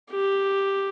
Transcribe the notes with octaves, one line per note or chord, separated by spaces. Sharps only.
G4